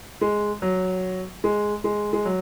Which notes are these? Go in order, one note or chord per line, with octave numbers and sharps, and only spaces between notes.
G#3
F#3
G#3
G#3
G#3
F#3